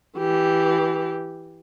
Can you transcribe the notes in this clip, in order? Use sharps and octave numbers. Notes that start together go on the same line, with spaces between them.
E3 G4